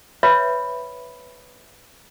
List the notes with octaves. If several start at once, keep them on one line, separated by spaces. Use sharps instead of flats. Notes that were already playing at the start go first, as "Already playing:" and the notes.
B4 C#5 E5 B5